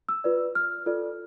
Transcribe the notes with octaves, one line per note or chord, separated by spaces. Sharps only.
E6
F4 B4 D5
F6
F4 A4 D5